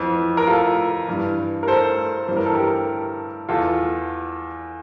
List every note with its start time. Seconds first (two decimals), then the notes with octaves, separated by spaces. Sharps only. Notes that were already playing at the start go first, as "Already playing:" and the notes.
Already playing: F2 E3
0.37 A#4
0.47 F4 A4
1.08 G2 E3
1.63 A#4
1.67 A4 C5
2.28 G2 E3 C5
2.37 A#4
2.46 A4
2.54 G4 A#4
3.49 E2 E3 F4 A4